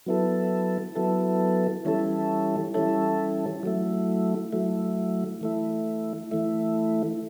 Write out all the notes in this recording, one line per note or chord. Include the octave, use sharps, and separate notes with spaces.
F#3 B3 E4 A4
F#3 B3 E4 A4
E3 G3 C#4 E4 A4
E3 G3 C#4 E4 A4
F#3 A3 E4
F#3 A3 E4
E3 A3 E4
E3 A3 E4